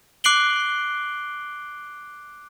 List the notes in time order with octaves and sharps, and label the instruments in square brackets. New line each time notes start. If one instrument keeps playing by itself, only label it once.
[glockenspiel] D6 F#6 C7 D7 F#7 G7